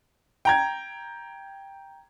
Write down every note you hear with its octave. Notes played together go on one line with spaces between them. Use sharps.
G5 A#5 G#6